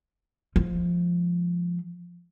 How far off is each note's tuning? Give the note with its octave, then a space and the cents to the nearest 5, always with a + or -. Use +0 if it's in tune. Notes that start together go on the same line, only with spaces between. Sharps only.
F3 -5 G#3 +5